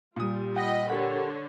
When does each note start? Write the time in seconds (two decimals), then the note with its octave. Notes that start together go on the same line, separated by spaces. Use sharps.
0.16 A#2 G3 F4 D#6
0.56 D#5 F#5 G5 B5
0.90 D3 G4 A#4 C#5 F#5